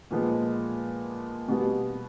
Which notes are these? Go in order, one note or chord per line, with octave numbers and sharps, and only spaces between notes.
A#2 F3 G#3 B3
B2 G3 B3